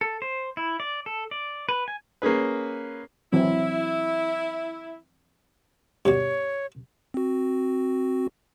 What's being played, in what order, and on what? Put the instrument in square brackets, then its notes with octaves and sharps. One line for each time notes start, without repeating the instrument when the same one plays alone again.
[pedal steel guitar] A4
C5
E4
D5
A4
D5
B4
G#5
[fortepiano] A#3 C#4 G#4 B4
[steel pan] E3 F#3 C4 [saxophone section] E4
[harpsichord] G2 B2 [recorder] C#5
[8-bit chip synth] C4 F#4